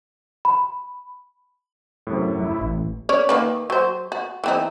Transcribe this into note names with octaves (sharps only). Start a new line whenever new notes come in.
B5
F#2 A2 C3
E4
A1
C#4 C#5 D5
D#3 A#3 B4
F#3 C5
F#4
E3 C4 D#4